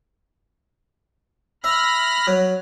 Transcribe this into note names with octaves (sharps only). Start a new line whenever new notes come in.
E5 B5 F6 A#6
F#3